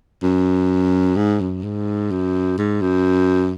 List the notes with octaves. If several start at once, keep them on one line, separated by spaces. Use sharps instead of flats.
F#2
G#2
F#2
G#2
F#2
G#2
F#2